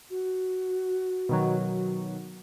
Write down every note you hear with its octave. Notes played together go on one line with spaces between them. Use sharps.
F#4
B2 D#3 F#3